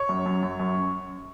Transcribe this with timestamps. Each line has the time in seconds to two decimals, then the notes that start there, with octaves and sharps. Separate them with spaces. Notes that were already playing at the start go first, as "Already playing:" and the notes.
Already playing: C#5
0.09 F#2
0.26 F#2
0.43 F#2
0.60 F#2